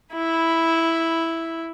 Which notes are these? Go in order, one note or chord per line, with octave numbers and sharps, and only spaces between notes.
E4 B5